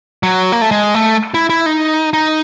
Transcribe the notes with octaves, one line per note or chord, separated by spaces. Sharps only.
F#3
A#3
A3
G#3
A3
E4
E4
D#4
D#4